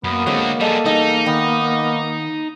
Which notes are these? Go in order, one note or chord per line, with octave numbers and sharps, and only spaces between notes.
F#2 A#3 B3
D3 F#3 G#3 C4 F#4
G3 G#4 A4 D#5
E2 G3 D#4 D#5
D#3 B3